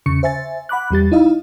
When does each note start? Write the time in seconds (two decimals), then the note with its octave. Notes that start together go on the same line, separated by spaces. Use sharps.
0.06 E2 C#3 C#6 C#7
0.23 C5 E5 G#5 A6
0.69 F#5 B5 D6 F#6
0.91 E2 G3 G4 A6
1.12 D#4 E4 D#5 F5